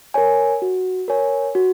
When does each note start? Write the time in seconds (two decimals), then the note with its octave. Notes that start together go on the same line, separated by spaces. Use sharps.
0.14 A#4 C#5 G#5
0.62 F#4
1.08 A#4 C#5 G#5
1.55 F#4